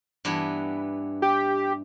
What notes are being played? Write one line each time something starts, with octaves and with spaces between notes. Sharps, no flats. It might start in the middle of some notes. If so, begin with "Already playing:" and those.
G2 E3 B3
G4